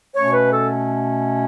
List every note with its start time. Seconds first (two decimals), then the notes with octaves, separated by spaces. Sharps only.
0.16 B2 A3 C#4 C#5
0.33 B4
0.51 A4